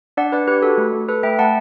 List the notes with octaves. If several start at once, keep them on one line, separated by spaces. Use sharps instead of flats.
D4 D5 F#5
D4 B4 D5
G4 B4
F#4 A4
A3
A3
A4 B4
A3 E5 G5
A3 F#5 A5